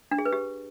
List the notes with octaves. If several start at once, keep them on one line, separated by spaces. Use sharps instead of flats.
D4
G#4
B4
G4